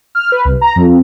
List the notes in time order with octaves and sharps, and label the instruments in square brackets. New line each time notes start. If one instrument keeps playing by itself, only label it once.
[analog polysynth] F6
B4
C2
A#5
F2
F2